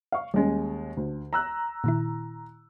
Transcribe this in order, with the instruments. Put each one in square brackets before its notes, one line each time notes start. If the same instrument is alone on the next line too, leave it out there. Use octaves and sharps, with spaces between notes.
[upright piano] F5 C#6
[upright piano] D#2 G#3 [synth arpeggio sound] G3 C#4
[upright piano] D2
A#5 E6 F#6
[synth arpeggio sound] A#2 D#3 E4